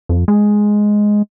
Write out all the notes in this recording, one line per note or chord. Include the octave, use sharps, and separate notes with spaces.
F2
G#3